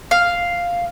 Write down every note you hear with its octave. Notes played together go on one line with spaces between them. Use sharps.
F5